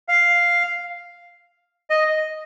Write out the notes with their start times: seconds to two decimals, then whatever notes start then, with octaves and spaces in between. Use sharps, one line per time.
0.08 F5
1.90 D#5